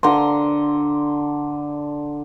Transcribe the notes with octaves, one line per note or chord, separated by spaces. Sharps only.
D3 A#5 C6